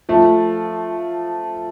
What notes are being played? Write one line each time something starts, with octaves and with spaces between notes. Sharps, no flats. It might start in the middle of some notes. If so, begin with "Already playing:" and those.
F3 A3